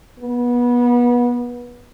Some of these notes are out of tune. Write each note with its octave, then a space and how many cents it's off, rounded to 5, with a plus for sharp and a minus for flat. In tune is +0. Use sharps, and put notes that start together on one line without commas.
B3 -25